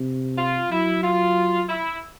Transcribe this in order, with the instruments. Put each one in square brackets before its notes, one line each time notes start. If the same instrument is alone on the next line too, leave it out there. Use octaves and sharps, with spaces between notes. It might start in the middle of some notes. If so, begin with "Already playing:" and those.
Already playing: [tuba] C3
[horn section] F4
[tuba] F#3 [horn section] E4
[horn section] F4
E4